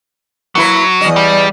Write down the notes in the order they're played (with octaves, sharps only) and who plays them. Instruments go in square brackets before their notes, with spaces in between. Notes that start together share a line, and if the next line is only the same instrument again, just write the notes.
[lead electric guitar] F#3 [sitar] A#3 E4 B4
[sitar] E2 D#5
[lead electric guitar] G3